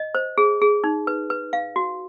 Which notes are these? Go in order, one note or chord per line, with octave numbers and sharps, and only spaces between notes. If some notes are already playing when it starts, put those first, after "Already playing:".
Already playing: D#5
C5
G#4
G#4
D#4
B4
B4
F5
F#4